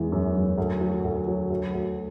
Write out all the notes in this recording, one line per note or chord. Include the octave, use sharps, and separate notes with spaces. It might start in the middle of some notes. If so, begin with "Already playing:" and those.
Already playing: E2 E3 G#3
F#2
F#2
D2
F#3
D2
F#3
D2
D2